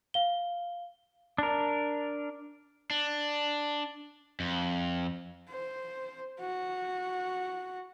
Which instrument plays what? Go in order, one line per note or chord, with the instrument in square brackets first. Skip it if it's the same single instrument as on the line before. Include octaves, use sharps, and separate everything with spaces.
[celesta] F5 G7
[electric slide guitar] D4 A#4
[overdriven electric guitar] D4
F2
[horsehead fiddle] C5
F#4